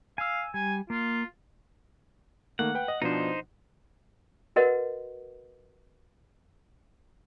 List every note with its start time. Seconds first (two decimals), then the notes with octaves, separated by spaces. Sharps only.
0.18 F5 G#5 E6
0.54 G3 G#5
0.90 A#3 F4
2.59 D#3 A3 A#3 F#5
2.75 B4 G5
2.88 D#5
3.02 B2 F3 D4 D#4 C5
4.56 F#4 A#4 B4 D#5 F#5